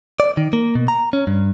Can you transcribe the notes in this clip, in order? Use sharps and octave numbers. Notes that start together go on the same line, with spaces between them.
D5
D#3
A#3
B2
A#5
C#4
G2